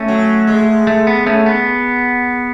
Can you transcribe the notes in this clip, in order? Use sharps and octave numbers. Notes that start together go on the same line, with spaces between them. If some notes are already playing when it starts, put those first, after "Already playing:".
Already playing: A3 C#4
F#3
G#3
A3
B3
A3 C#4
B3